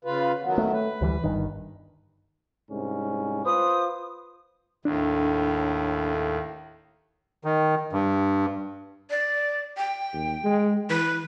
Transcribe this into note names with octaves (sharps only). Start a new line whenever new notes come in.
C#3 F4 B4
D#3 F#3 B3
A3
B4
D2 E3 G3
G1 G2 D#3
C2 G#2 C#4
F4 B4 C5 D#6
D#2 A2 D4
D#3
G2
D5
G5
D#2
G#3
E3 B4